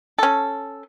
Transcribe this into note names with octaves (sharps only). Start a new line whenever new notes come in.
C#4 A4